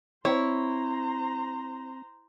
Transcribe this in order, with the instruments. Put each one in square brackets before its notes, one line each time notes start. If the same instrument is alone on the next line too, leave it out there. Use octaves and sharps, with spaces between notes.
[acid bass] C4 [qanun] E4 [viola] C5 A#5 [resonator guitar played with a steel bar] C#5